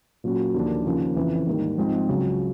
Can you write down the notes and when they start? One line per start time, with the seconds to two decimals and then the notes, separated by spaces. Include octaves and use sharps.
0.24 A#2 F#3 A#3 C#4 F#4
0.54 D#2 D3 F3 A#3 D4
0.86 D#2 C#3 F3 A#3 C#4
1.16 F2 C#3 E3
1.47 G#2 D#3 G3 A#3
1.78 G#2 F3 G#3 C4
2.09 C#2 C#3 F#3